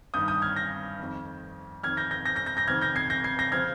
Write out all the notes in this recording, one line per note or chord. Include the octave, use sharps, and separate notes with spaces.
G2 D#3 D#6 G6
D#6 G6
F6 G#6
G6 A#6
F2 D#3
F2 D#3 F6 G#6
G6 A#6
G6 A#6
G6 A#6
G6 A#6
G6 A#6
G6 A#6
F2 C3 D#3 F6 G#6
G6 A#6
G#6 C7
G6 A#6
G#6 C7
G6 A#6
C#3 F3 F6 G#6